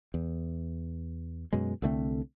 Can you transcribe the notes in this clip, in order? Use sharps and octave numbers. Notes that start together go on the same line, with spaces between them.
E2
F#2 B2 G#3
C2 D3 A3 C4